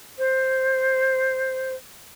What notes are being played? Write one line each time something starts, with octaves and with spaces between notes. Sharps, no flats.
C5